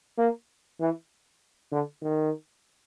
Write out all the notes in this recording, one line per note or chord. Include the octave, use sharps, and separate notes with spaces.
A#3
E3
D3
D#3